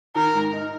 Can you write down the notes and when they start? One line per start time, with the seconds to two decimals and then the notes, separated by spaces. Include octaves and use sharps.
0.15 D#3 A#4
0.34 G#2
0.53 D#4